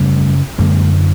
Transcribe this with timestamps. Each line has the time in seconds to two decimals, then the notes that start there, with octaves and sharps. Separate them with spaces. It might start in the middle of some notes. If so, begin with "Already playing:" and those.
Already playing: F#2 C#3 G3 A3
0.59 F#2 D3 G#3 A#3